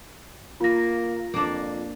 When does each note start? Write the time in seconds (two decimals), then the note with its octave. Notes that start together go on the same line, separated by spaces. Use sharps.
0.61 A#3 F4 A#6
1.34 F2 A#3 D4